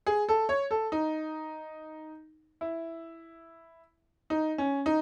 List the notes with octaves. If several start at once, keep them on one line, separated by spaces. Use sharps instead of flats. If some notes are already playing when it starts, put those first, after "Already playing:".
G#4
A4
C#5
A4
D#4
E4
D#4
C#4
D#4